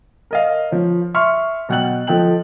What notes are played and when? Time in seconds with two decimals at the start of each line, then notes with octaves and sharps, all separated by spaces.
0.31 A#4 D#5 F5
0.71 F3 C#5
1.14 E5 C6 C#6 F6
1.69 B2 F#3 F#5 G5 F#6 F#7
2.07 F3 A4 D#5 G5 F#7